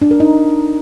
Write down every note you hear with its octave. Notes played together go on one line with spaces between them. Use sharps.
D4
A#4
D#4